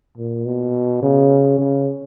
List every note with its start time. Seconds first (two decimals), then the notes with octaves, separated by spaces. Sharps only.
0.18 A#2
0.46 B2
1.03 C#3
1.58 C#3